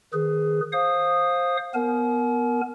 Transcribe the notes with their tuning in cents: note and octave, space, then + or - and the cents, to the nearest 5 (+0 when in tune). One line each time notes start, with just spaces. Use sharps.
D#3 +0 G#4 +0 B4 +30
C5 +15 F5 +10 D#6 -10
B3 +0 A#4 +0 G#5 +45